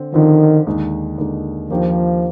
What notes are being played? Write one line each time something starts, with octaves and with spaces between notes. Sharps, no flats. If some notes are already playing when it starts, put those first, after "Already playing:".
Already playing: D3 C4
D3 D#3 F3 C4
D#2 D3 G#3 D#4
D#2 D3 G#3 D#4
D#2 D#3 F3 A#3 D4 G4